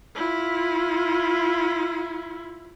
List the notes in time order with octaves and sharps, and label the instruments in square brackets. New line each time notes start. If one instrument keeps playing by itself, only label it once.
[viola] E4 F4